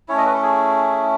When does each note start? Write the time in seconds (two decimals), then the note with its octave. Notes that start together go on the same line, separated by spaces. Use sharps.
0.08 A3 C#4 E4 C#5
0.18 D#5
0.26 B4
0.34 A4
0.43 G#4